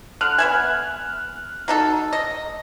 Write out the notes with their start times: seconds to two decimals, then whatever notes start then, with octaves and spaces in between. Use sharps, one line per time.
0.21 D3 F6 F#6
0.38 B3 E5 G#5
1.68 F#3 D#4 A4
2.13 D#5